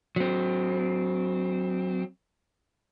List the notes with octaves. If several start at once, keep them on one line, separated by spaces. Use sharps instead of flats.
F#3 C4